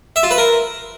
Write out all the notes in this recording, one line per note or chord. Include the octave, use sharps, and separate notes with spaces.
E5
F4
B4
A#4